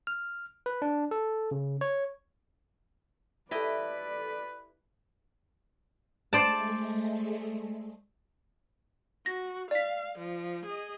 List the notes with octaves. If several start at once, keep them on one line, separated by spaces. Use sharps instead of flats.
F6
B4
D4
A4
C#3
C#5
E4 G4 A4 B4 D5 D#5 B6
G#3 A3 C5 D5 A5
F#4 A#6
D5 F5 B6
F3
G#4 D#5